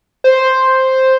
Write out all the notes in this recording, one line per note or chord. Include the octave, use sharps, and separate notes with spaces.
C5